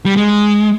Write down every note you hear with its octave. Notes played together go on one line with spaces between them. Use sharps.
G3
G#3